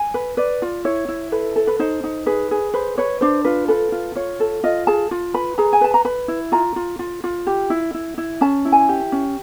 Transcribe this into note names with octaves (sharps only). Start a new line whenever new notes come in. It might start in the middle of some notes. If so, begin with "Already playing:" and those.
Already playing: G#5
B4
B4 D5
F4
E4 C#5
E4
A4 B4
A4
B4
D#4 C5
D#4
G#4 B4
G#4
B4 C5
B4 C#5
D4 C5
F4 B4
A4 B4
F4
F4 C#5
A4
F4 D#5
G#4 A5
F4
B4 B5
G#4 A#5
G#5
B4 A5
A#5
B4 B5
E4
F4 A#5
F4
F4
F4
G4
E4
E4
E4
C#4 A5
E4
G#5
G4
C#4